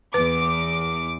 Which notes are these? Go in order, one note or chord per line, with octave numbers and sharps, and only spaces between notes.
E2 B4 D6